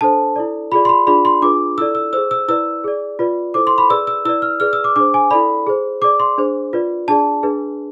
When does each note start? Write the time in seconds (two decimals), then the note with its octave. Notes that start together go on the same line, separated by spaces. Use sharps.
0.01 D4 A4 C5 A5
0.36 E4 A4 D5
0.72 F4 G#4 D5 B5
0.85 C6
0.89 B5
1.07 D4 F4 G#4 D5 B5
1.25 C6
1.42 D4 F4 G#4 B4 D6
1.78 E4 A4 D5 E6
1.95 E6
2.13 G#4 C5 E6
2.31 E6
2.48 E4 B4 D5 E6
2.84 G#4 D5
3.19 F4 B4 D5
3.54 E4 A4 C5 D6
3.67 C6
3.78 B5
3.90 G#4 B4 D5 E6
4.07 E6
4.25 E4 B4 D5 E6
4.42 F6
4.60 G#4 B4 D5 F6
4.73 E6
4.84 D6
4.96 D4 G#4 C5 D6
5.14 G#5
5.31 E4 A4 D5 B5
5.67 G#4 C5
6.02 G#4 D5 D6
6.20 C6
6.38 D4 G#4 C5
6.73 F4 B4 D5
7.08 D4 G#4 D5 A5
7.43 D4 G#4 B4